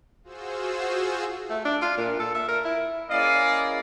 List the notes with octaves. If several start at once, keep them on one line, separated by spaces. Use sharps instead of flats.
F4 F#4 G#4 C5 E6
A3
D4
F4
A#2
A4
E5
A#4
E4
A#3 C#4 E4 G#4 D5 D#5 F5